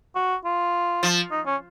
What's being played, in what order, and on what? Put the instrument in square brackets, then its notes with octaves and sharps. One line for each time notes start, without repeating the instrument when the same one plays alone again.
[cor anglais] F#4
F4
[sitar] F3
[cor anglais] D#4
C#4